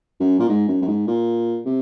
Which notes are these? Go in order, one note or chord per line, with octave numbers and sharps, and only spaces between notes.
F#2
A#2
G#2
F#2
F#2
G#2
A#2
C3